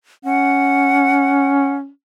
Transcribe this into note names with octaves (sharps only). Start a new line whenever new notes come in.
C#4 F#5